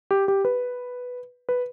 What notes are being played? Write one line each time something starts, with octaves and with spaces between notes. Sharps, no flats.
G4
G4
B4
B4